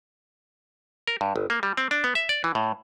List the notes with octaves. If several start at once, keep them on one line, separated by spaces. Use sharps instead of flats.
A#4
G2
G1
A#3
G3
C4
D4
B3
E5
D5
E3
A2